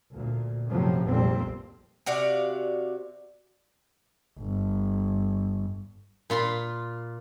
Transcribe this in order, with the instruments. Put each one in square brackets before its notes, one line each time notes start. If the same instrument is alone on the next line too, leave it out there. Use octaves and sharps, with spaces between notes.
[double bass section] D2 A#2
F#2 A2 C3 F3 F#3
F1 A#1 F2 A#2 G3 C4
[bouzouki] C3 F#4 D5 F5
[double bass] G1
[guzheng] A#2 F4 B5 C6